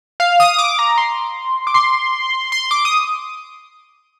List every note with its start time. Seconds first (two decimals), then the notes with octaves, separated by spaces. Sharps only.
0.20 F5
0.40 D#6
0.58 D6
0.79 A#5
0.98 C6
1.67 D6
1.74 C6
2.52 C6
2.71 D6
2.85 D#6